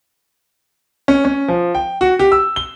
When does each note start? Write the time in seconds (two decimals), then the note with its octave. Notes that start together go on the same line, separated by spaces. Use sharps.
1.08 C#4
1.25 C#4
1.48 F3
1.75 G5
2.01 F#4
2.19 G4
2.32 E6
2.56 G7